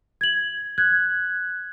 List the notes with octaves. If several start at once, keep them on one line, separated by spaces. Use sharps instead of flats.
G#6 F#7
F#6 G#6